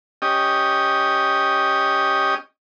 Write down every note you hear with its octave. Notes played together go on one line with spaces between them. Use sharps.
C#4 G4 D#5